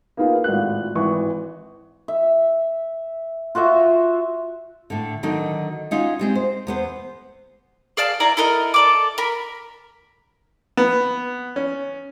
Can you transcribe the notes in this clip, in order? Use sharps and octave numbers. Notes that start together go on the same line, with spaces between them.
A#3 B3 D#4 F4 G#4
G#1 A2 F4 F#4 F#6
G#1 E3 C#6
E5
F4 F#4 C5 E5
A2 D3
D3 D#3 F#3 D#4
C#4 D#4 F4 F#4
G3 G#3 C4
C5
E2 B3 C5
G#4 D5 F5 A5
E4 D5 G#5 A#5
E4 A4 A#4 D#5
A4 D5 D6
A#4 B5
B3
C#4